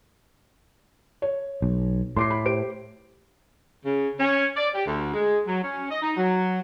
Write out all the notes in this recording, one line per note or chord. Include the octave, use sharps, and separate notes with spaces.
C#5
B1
A2 C6 D6 C7
B5
G4 C5 D7
C#3
C#4
D5
G4
D2
G#3
F#3
C#4
D#5
D#4
F#3